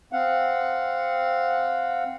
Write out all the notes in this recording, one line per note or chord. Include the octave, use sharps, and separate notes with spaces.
C4 F5 F#5